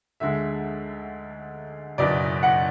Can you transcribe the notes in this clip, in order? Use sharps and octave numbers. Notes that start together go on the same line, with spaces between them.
D2 D3 G#3 E5
F#1 E2 B2 D5
F#5